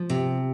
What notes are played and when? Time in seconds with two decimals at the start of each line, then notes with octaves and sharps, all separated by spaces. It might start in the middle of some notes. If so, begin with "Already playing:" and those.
Already playing: F3
0.10 C3